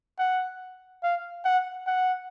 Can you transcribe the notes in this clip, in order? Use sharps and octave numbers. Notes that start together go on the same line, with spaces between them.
F#5
F5
F#5
F#5